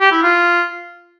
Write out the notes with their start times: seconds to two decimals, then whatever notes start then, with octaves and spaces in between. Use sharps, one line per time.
0.01 G4
0.12 E4
0.23 F4